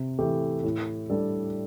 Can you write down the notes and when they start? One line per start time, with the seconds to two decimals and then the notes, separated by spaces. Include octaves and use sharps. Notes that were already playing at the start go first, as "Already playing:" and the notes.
Already playing: C3
0.19 E3 A3 E4 G4
0.64 A2
1.10 G3 D4 A4